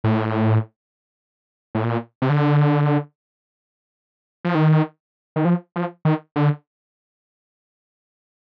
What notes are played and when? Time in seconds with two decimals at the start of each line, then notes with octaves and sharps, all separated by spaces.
0.04 A2
1.75 A2
1.84 A#2
2.22 C3
2.30 D3
4.45 F3
4.55 D#3
5.36 D#3
5.45 F3
5.76 F3
6.05 D#3
6.36 D3